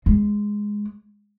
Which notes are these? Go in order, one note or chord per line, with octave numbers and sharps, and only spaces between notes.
G#3